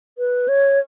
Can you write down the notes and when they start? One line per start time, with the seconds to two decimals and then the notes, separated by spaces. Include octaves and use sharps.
0.18 B4
0.48 C#5